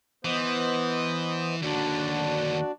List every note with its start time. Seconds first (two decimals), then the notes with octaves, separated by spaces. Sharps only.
0.25 E3 B3 C5 D#5
1.62 D#2 D3 D4 F#4 D5